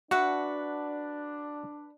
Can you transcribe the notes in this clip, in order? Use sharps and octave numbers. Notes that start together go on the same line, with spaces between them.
D4 F#4 B4 E5 F#5